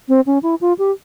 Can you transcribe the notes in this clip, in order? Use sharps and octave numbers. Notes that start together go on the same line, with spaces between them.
C4
C#4
E4
F4
G4